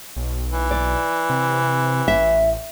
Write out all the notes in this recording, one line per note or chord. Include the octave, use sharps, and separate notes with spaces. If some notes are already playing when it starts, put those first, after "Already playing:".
B1
E3
D5
C3
A1 E5